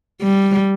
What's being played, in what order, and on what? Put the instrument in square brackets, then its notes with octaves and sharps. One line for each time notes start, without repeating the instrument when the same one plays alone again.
[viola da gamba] G3